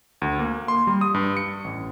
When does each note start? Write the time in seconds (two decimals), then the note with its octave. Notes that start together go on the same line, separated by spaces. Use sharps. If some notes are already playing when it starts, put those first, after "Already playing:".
0.22 D2
0.39 A#3
0.68 C6
0.87 G3
1.01 D#6
1.14 G2
1.37 C#7
1.64 A1